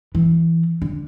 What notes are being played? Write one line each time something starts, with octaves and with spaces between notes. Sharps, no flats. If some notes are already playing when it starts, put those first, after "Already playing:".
E3
D3